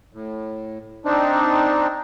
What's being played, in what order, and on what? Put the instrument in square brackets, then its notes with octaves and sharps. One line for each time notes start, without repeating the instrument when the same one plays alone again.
[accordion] A2
C4 D4 D#4